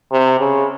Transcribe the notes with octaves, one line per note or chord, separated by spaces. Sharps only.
C3
C#3